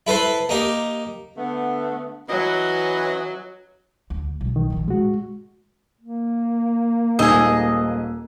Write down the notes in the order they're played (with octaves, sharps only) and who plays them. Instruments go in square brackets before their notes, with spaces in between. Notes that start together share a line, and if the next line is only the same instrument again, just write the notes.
[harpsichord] E4 A4 B4 C5
A#3 D#4 G4
[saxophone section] D3 A3 B3
[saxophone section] E3 C#4 B4 [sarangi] F#3 [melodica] D#5
[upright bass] D2
B1
[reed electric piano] D#3
[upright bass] A#1 F3
[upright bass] A2 [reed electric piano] G#3 F#4
[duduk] A#3
[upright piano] D#1 G#2 E6 [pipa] G4 G#4 [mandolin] D#5